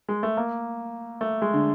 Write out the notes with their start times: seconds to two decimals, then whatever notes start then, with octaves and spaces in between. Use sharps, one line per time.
0.09 G#3
0.23 A3
0.37 A#3
1.21 A3
1.42 G#3
1.54 D3